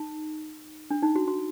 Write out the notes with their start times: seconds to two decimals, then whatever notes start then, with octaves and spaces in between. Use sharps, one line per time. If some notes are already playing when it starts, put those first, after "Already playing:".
Already playing: D#4
0.91 D4
1.03 D#4
1.16 F#4
1.28 F#4